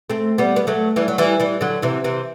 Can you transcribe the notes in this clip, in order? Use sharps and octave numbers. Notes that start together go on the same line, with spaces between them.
A3 C4
G3 B3
B3
F#3 A3
E3 G3
F#3
E3 G3
E3 G3
D3 F#3
C3 E3
C3 E3